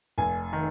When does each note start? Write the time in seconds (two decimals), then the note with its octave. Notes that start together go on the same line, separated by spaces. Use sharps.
0.18 F1 G#5
0.53 D#3